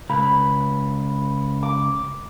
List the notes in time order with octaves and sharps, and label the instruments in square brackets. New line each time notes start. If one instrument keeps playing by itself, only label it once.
[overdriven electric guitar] C#2 [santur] B5
[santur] D6